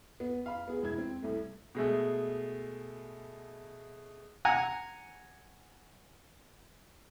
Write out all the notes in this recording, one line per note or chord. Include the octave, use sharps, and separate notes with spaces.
B3
F5 B5
B3 G#4
E1 E4 G#6
C4
C2 A3
B2 G#3 A3
F#5 G#5 A#5